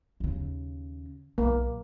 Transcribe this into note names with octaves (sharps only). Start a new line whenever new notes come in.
D#2 C#3
B1 A#3